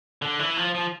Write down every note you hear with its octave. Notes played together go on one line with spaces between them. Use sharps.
D3
E3
F3
F3